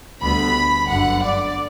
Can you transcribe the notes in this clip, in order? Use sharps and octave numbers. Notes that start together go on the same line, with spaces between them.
D2 D3 G3 B3 B5
G1 F#2 D3 F#5
D5